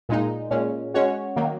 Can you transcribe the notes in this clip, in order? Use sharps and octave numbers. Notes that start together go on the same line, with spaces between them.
A#2 G#3 D#4
A#2 G#3 C#4
G#3 C#4 F#4 C#5
D#3 F#3 A#3